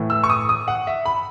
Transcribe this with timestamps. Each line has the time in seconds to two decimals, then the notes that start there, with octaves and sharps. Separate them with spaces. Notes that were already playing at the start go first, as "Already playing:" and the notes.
Already playing: A2 E3 A3
0.10 E6
0.24 C#6
0.30 D#6
0.49 D#6
0.68 F#5
0.87 E5
1.06 B5